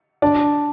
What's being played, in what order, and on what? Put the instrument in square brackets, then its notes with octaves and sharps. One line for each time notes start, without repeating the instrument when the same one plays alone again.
[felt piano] D4 D5